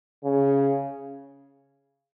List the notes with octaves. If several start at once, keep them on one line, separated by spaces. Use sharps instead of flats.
C#3